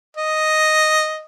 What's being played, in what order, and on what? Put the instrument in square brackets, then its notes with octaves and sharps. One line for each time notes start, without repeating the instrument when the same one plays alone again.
[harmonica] D#5